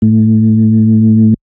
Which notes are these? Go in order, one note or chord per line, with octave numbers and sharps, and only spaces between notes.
A2